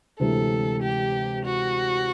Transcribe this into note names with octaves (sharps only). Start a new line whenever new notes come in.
D2 C3 E3 G#3 A4
G4
F#4